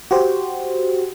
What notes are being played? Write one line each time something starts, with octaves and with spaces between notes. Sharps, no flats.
F#4 G4 C5